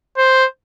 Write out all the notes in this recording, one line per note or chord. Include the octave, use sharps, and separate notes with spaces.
C5